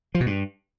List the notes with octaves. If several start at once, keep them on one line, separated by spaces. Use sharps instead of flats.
F3
B2
G2